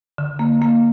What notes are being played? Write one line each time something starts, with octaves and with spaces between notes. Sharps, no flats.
D3
A#3
A#3